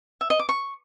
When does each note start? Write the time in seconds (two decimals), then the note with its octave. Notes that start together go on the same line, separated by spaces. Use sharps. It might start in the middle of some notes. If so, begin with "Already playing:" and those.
0.21 E5
0.30 D#5
0.39 D6
0.49 C#6